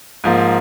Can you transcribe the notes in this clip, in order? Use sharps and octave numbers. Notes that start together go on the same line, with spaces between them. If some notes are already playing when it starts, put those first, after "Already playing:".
G#2 F3 A#3